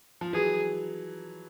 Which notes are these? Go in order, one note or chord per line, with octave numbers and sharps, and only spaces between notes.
F3
E3 F#3 G#4